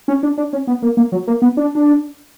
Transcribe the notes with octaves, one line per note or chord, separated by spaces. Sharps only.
C#4
D4
D4
C#4
B3
A#3
A#3
F#3
A#3
B3
D4
D4